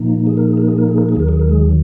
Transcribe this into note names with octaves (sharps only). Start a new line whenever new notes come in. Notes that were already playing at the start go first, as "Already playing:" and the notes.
Already playing: A#2 F3 A#3 D#4
G#4
A#4
G#4
A#4
G#4
A#4
G#4
A#4
G#4
D#2 D#3 F#3 A#4
G#4
A#4
G#3 G#4